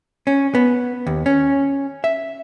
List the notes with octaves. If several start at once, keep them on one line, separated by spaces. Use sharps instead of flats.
C#4
B3
D#2
C#4
E5